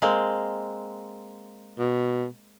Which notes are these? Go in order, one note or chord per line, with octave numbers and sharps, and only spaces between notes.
G#3 A#3 C4
B2